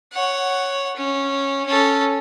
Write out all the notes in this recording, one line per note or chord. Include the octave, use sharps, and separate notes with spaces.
C#5 F#5
C#4
C#4 A4